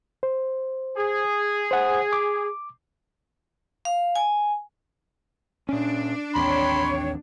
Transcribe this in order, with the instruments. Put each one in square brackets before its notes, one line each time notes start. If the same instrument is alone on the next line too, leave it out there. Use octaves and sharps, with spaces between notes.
[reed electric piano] C5
[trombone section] G#4
[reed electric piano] C5 F#5
D6
[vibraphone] F5
G#5
[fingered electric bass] A#2 C#4 [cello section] D4
[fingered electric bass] A1 D#2 C4 [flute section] C#5 G5 [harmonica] B5 C6